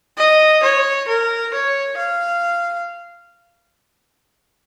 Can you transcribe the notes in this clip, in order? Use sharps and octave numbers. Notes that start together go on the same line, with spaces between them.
D#5
C#5
A#4
C#5
F5